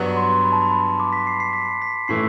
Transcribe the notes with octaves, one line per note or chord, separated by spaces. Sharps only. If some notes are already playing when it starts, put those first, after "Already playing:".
Already playing: G2 F#3 B3 D4
C6
B5
A5
B5
B5
D6
B6
C7
C7
B6
B6
A2 E3 A3 E4 C7